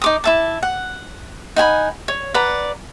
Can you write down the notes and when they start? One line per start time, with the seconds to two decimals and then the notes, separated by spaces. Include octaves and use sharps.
0.02 D#4 D6 D#6
0.24 E4 E5 A5
0.63 F#5
1.56 D#4 F#5 G#5 B5
2.08 C#5
2.34 B4 D5 F#5 A#5